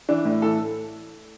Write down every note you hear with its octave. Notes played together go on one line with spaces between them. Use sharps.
E3 D4
A2
E3 A4